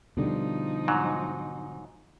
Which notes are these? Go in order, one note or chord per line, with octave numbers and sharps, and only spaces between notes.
B2 D3 F3 G3 D#4
G#2 F#3